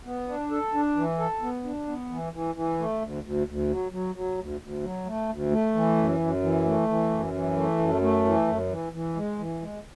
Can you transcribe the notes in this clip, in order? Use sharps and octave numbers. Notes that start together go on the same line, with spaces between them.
B3
D4
A4
D4
E3
A4
B3
D4
B3
E3
E3
E3
A3
D2
D2
D2
F#3
F#3
F#3
D2
D2
F#3
A3
D2
A3
E3
F#2
F#2
E3
A3
E3
F#2
E3
A3
F#2
A3
E3
F#2
E3
E3
G#3
E3
G#3